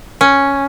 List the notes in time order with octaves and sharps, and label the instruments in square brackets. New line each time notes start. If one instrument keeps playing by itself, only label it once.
[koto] C#4